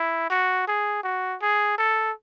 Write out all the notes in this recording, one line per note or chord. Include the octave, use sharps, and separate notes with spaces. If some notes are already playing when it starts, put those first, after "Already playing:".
Already playing: E4
F#4
G#4
F#4
G#4
A4